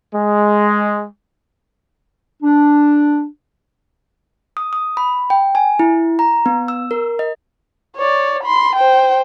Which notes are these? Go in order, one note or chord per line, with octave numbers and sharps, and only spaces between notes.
G#3
D4
D#6
D#6
B5
G5
G#5
E4
A#5
B3
E6
A#4
D#5
C#5 D5
B5 C6
C5 G5